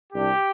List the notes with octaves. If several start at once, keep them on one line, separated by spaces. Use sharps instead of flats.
C2 C3 G3 D4 G4